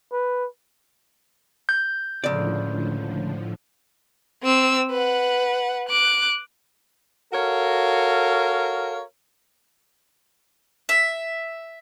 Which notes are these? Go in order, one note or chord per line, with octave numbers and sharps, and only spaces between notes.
B4
G6
C#2 A2 D3 F3 D5
C4 E6
B4 F#5
D6 F#6
F#4 A4 A#4 C#5 F5
E5